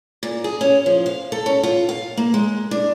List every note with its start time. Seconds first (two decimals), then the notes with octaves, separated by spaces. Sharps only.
0.23 A#2
0.44 G#4
0.61 C#4
0.86 F3
1.06 F5
1.32 A4
1.46 C#4
1.63 F4
1.89 F5
2.17 A#3
2.34 G#3
2.71 D4